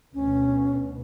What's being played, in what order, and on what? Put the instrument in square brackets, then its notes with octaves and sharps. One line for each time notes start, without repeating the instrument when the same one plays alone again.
[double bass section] D2 B2 [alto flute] C#4